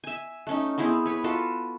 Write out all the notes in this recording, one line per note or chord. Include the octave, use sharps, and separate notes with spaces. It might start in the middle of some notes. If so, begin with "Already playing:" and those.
E5 G#5
A3 C#4 D#4
B3 C4 E4 G#4
B4 C#5
F4 F#4 A4 B4